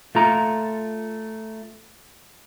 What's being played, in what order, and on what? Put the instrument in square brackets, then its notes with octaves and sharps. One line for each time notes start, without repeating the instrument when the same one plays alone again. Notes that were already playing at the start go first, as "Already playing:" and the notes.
[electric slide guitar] A3 F4 A#5